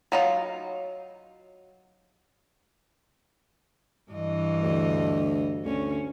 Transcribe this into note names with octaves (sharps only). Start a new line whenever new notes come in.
F#3 D#4 F4 C#5 F5 F#5
G2 E3 D#5
D2
D2 C#4